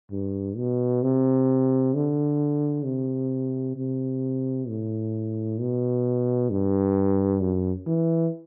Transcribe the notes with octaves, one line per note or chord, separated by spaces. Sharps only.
G2
B2
C3
D3
C3
C3
A2
B2
G2
F#2
E3